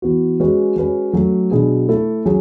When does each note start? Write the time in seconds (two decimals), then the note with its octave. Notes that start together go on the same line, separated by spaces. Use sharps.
0.02 E3 B3 F#4
0.40 G#3 C#4 F#4 B4
0.76 G#3 C#4 F#4 B4
1.13 F#3 A3 C#4
1.51 B2 F#3 B3 D4 G#4
1.88 A3 E4 A4
2.25 F#3 C#4 G#4